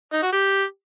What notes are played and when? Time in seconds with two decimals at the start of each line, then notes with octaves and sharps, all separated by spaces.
0.13 D#4
0.23 F#4
0.33 G4